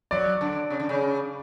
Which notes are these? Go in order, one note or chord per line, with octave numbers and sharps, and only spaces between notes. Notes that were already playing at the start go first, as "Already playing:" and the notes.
F#3 D5
D3
C#3
D3
C#3